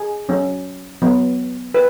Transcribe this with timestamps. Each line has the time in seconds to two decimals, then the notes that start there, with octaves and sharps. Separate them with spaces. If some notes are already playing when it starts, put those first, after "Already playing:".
Already playing: G#4
0.29 F#3 C#4
1.02 F#3 B3
1.74 B4